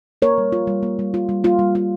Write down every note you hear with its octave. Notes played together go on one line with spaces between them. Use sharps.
A#3 A#4 C#5
G3
F4
G3
A#3
G3
F4
G3
A#3 F4
G3
F4